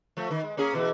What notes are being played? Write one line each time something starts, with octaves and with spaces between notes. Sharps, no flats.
F3 A3
D#3
G#3
A#3 C#4 G#4
B2 E3